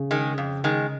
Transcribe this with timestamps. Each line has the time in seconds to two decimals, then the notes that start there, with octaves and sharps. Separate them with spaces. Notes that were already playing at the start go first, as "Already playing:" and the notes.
Already playing: C#3
0.11 D#3 G#3
0.38 F2
0.64 D#3 G#3